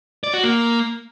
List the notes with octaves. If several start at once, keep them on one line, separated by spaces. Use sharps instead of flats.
D5
F#4
A#3